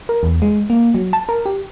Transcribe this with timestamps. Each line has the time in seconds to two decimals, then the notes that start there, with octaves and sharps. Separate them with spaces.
0.09 A#4
0.23 E2
0.42 G#3
0.70 A#3
0.94 F#3
1.13 A5
1.29 A#4
1.46 G4